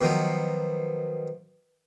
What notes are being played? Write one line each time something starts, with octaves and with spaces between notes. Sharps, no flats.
B2 D#3 F3 F#3